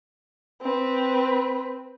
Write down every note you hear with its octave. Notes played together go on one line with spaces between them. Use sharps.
C4 B4